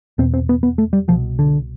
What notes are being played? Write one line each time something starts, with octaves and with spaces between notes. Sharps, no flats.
E2 B2 C4
C4
B3
B3
A3
G3
C2 B2 F3
D3